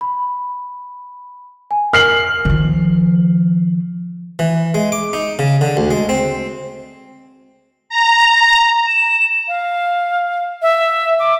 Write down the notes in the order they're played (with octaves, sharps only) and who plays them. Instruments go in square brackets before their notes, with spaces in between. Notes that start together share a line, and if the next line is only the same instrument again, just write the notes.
[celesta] B5
G#5
[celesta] A#4 [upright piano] F6 C7 F#7
[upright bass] D#3 F3
[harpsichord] E3
G#3
D6
D#4
C#3
D3
D2
G#3
C4
[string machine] A#5
[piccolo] E7
F5
E5
D6